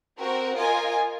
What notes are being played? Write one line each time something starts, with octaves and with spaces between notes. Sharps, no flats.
C4 F#4 A#4
F4 A#4 D#5 G#5